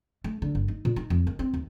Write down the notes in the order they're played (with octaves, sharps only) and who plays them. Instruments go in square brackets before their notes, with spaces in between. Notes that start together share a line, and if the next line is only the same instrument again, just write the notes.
[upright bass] A3
D3
G1
D#4
A#2
D#4
F2
D#3
C4
D#2